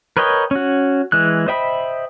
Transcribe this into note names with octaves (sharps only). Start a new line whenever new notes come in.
A#4 B4 C#5 D#5 G5
C#4 F#4
E3 G#3 F#6
C5 D#5 E5 G5 B5